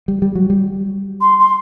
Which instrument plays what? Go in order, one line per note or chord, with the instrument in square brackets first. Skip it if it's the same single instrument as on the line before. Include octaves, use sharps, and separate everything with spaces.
[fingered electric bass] G3
G3
F#3
G3
[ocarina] C6
C6